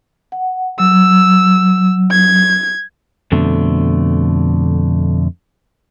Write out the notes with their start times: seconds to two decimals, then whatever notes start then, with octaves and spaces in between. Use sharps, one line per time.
0.32 F#5
0.80 F#3 E6
2.11 G#6
3.32 F2 B2 D3 A3